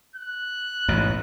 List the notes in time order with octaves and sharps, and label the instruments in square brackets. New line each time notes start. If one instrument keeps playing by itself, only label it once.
[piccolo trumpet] F#6
[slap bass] A1 G#2 B2